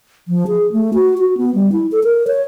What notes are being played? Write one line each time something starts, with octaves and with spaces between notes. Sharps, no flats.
F3
G#4
A3
F#4
F#4
B3
G3
E4
A4
A#4
C#5